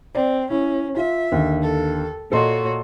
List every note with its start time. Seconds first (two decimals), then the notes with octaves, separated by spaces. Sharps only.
0.15 C4 D5
0.50 C#4 E4
0.97 F4 E5
1.32 D#2 D3
1.63 A4
2.32 A#2 F#4 A4 C#5 D#5 C6